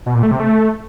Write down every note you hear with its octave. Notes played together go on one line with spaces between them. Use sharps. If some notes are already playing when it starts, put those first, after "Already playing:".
B2
A#2
A3
C3
A3